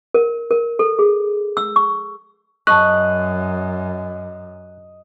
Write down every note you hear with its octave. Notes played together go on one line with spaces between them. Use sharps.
A#4
A#4
A4
G#4
E6
C#6
F#2 D#5 A5 C#6 F#6